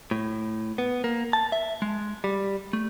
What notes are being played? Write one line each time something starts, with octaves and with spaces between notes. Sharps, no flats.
A2
B3
A#3
A5
E5
G#3
G3
A3